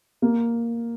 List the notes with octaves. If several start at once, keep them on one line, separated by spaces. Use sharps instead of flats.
A#3